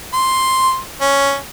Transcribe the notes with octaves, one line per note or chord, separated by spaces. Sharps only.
C6
C#4